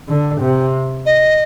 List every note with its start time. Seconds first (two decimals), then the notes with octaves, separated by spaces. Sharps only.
0.09 D3
0.41 C3
1.06 D#5